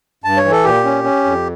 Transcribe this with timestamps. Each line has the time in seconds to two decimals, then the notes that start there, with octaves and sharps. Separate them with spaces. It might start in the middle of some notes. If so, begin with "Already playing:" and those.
0.24 G2 A5
0.37 C#5
0.45 E3
0.51 A4
0.64 A#2 G4
0.85 C#4
1.04 C#4
1.24 F2